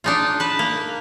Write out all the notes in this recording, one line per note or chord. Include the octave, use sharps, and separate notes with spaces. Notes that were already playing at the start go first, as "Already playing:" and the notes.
D4 D#4 F4
B4 A5
A#3